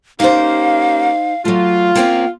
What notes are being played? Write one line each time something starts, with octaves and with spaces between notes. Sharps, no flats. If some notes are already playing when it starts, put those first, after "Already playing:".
A#3 C#4 D#4 G4 C5 F5
F#3 A3 F4
A#3 C4 C#4 G5